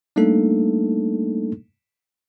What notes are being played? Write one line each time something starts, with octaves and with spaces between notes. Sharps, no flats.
G3 A3 A#3 D4 D#4 A4